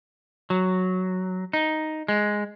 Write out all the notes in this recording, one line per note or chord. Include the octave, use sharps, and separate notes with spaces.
F#3
D#4
G#3